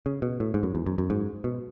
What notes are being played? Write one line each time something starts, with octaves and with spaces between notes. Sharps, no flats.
C#3
B2
A2
G#2
F#2
E2
F#2
F#2
G#2
B2